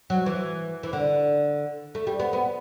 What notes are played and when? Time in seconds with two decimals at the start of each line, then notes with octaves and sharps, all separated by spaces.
0.10 F#3
0.26 E3
0.83 E3
0.93 D3
1.95 A3
2.07 G3
2.20 B3
2.33 B3